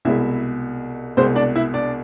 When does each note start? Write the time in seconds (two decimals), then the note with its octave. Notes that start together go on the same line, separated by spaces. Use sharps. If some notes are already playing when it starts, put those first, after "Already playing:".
0.05 C2 B2 G#3 E4 E5
1.17 C2 B2 G#3 C4 C5
1.36 D4 D5
1.56 E4 E5
1.74 D4 D5